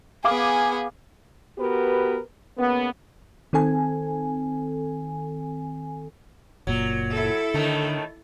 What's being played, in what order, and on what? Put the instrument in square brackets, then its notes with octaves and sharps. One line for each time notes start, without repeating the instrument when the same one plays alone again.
[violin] B3 G#4 [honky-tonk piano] F5 D6 [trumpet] G#5
[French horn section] B3 F#4 G4 A#4 B4
C#3 A#3 B3
[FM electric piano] D#3 C4 A4 G#5
[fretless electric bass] F#1 A#2 [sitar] F#3
[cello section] E4 A4
[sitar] A2 D#3 A3 [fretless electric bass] D3